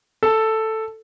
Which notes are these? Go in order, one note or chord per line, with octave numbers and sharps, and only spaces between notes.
A4